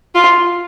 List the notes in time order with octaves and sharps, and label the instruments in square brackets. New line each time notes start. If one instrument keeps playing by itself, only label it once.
[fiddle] F4